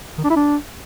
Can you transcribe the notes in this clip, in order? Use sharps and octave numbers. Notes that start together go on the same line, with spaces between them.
D#3
D4
E4
D4